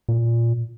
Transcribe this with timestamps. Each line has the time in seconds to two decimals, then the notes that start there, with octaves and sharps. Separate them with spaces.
0.09 A#2